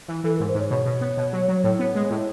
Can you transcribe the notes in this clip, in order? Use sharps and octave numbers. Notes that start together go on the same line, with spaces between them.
E3
E3 A4
G#2 A#4
C5
G#2 C#5
B2 C#5
B2
B3
B2
F#3
F#3
A2
B3
G#3
A2